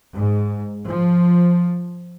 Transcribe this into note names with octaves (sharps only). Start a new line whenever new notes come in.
G#2
F3